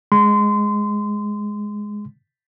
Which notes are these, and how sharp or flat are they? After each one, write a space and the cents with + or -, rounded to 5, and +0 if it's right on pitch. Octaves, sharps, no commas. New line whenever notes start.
G#3 +0 C6 -25